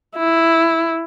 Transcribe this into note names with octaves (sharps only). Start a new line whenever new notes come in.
E4